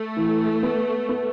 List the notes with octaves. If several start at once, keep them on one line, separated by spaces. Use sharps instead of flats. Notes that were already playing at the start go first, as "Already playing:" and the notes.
Already playing: A3
E3
B3
B3